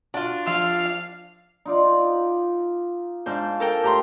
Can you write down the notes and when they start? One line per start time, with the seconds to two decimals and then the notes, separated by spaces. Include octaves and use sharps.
0.14 D4 F4 F#4
0.46 F3 C5 F5 E6
1.65 D#4 F4 D5
3.26 G#2 D4 C5 F5
3.60 A4 A#4 G5
3.84 A2 G4 A#5 C6